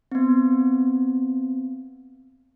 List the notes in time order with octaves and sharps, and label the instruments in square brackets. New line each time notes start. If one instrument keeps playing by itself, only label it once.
[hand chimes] B3 C4